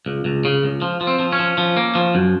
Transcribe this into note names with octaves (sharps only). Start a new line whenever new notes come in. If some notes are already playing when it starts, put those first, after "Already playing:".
C#2
C#2
C#3
C#2
F3
F3
C4
F3
C#4
F3
F3
A#3
F3
F#2